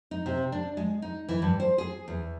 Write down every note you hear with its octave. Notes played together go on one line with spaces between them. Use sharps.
D#4
C3
D4
G#3
D#4
E3
G2
C5
G#4
E2